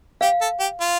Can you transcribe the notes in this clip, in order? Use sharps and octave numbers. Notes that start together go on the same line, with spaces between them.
G4 F5
A4
G4
F4